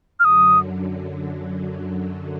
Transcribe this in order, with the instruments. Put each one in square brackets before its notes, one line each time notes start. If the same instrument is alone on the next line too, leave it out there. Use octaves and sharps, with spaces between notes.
[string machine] F#2 D3 F#3 [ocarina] D#6 F6